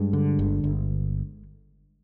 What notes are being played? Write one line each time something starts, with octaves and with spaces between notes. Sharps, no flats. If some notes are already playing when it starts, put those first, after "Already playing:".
Already playing: G2 G#3
D3
G1
G1